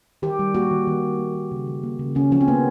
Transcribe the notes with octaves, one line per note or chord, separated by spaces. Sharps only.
D#3 G4
G3
A#3 F#4
D#3
D#3
G3
A#3
D#3
C#3
F3
A#3
C#3
C#3 C#4
F3 C#4
C4
A#3 B3